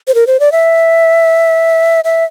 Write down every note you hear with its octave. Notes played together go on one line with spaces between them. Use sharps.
C5
A#4
C5
D5
E5
E5